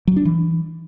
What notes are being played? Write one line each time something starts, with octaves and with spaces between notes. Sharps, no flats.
F#3
D4
E3